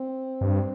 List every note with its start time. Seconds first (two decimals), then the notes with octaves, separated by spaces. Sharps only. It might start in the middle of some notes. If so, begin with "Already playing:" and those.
Already playing: C4
0.41 G2